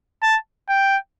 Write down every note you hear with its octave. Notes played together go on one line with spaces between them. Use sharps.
A5
G5